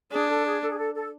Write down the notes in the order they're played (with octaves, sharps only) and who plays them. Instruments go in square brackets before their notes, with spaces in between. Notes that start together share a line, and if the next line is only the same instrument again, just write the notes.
[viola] D4 [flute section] G#4
[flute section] A4
G#4
A4
G#4
A4
A4